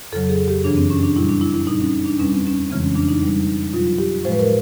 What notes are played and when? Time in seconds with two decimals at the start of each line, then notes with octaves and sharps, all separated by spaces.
0.12 F2 C#3 F#3 A4
0.29 G#4
0.48 G4
0.64 F#2 C#3 E3 D4
0.77 C4
0.90 C#4
1.03 D4
1.16 A#2 G3 E4
1.29 D4
1.41 E4
1.54 E4
1.67 A#2 G3 D#4
1.81 C#4
2.06 D4
2.18 E2 B2 G3 C#4
2.33 C4
2.47 C#4
2.70 F2 C#3 E3 G#3 C4
2.83 C#4
2.96 D4
3.09 D#4
3.22 B2 G3
3.73 B2 F#3 F4
3.98 G4
4.24 A2 F3 G#3 C5
4.32 B4
4.39 A#4